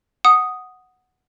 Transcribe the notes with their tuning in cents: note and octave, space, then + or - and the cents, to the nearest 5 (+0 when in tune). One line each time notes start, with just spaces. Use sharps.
F#5 +0 D#6 +0